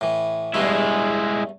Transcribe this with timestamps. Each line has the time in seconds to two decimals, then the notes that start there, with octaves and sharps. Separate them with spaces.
0.01 A2 E3
0.54 E2 G2 G#3 A3 E4